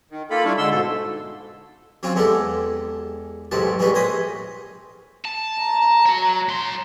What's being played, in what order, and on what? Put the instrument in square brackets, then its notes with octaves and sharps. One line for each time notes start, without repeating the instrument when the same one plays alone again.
[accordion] D#3
A#3 F4 A4 B5
G3 D4 E4 F4 C#5
D3 G#3 C6 E6
G#2 B2 A4
[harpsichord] F#3 C4 C#4 F4
E2 G#3 B3 G4 A4
A1 G#2 C3 F#3 A5
E3 G3 G#3 B3 C#4 B4
A#1 C5 D#5 G#5 B5 D#6
[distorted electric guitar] A5
[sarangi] A#5
[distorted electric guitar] F#4 C#5
F#3 C6